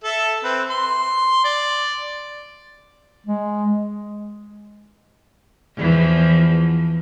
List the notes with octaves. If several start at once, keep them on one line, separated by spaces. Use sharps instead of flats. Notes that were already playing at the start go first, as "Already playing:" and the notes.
A4 E5
C4 B4
C6
D5
G#3
E2 E3 F3